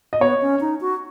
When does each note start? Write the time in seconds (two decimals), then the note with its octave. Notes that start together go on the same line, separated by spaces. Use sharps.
0.13 D#5
0.20 B3 C#5
0.42 C#4
0.61 D#4
0.81 F#4